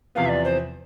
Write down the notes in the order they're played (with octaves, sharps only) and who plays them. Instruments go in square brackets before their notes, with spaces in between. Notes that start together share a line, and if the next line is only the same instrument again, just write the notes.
[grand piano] E2 C3 F3 B3 [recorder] F5
[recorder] E5
D5
C5